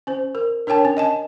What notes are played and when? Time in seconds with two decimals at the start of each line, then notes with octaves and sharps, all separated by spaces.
0.07 C#4 C5
0.35 A#4
0.67 D4 A#4 C#5 G5 A5
0.85 C#4
0.97 D#5 G#5 A5